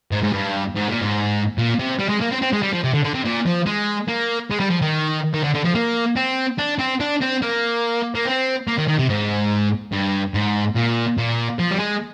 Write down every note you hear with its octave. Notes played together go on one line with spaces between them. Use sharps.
G#2
G#2
G2
G#2
A#2
G#2
A#2
C3
G3
G#3
A#3
C4
C4
G#3
G3
F3
C3
D3
D3
C3
A#2
F3
G#3
A#3
G#3
G3
F3
D#3
D#3
D3
D3
F3
A#3
C4
D4
C4
D4
C4
A#3
A#3
C4
A#3
D#3
D#3
C3
G#2
G2
G#2
A#2
A#2
F3
G3
G#3